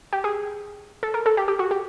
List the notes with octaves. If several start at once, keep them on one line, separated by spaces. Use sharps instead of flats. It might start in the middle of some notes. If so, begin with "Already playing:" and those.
G4
G#4
A4
A#4
A4
G4
G4
F#4
G4